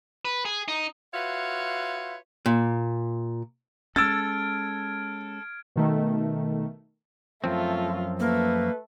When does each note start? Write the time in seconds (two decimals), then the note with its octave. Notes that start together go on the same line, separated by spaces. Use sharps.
0.25 B4
0.45 G#4
0.68 D#4
1.14 F4 F#4 B4 C#5 E5 F5
2.46 A#2
3.96 G#3 C#4 A4 E6 F6 G#6 A6 D7
5.76 B2 D#3 A3
7.44 F#2 F3 A3 C4 F4
8.20 A3 A#3 B4